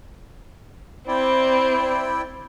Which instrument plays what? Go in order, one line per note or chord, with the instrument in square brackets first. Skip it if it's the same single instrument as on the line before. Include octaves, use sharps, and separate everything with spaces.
[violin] C4 [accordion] E4 D5 G5